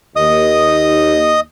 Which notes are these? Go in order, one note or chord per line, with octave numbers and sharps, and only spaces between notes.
D#2 D#5 D#6